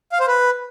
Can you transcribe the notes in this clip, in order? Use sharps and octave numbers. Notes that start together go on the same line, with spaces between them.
F5
C5
B4